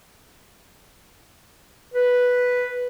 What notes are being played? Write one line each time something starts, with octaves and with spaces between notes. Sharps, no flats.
B4